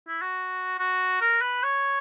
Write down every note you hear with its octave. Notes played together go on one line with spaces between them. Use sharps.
E4
F#4
F#4
A#4
B4
C#5